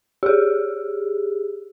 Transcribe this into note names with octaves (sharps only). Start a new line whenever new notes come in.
G4 G#4